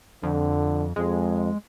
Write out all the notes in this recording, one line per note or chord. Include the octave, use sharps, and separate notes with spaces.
F2 D3
F2 G#3